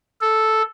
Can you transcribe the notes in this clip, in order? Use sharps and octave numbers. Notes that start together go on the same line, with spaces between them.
A4